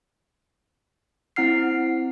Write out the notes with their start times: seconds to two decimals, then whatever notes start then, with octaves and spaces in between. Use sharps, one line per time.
1.36 C4 E4 F#5 F6 C7